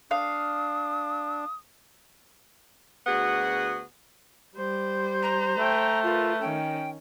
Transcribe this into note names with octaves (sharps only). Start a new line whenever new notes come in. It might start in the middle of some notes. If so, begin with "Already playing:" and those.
D4 F5 D#6
D2 B3 F#4 G#4 F#5
G3 C5
A#5
A3 G5
F4 A#4 B4
D#3 C#4 G5